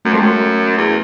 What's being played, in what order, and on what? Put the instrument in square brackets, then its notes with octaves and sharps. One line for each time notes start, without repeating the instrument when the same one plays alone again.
[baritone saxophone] F#2 [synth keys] A3
[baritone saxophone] F2 [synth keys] G#3
[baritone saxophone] F#2 [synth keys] A3
[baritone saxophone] E2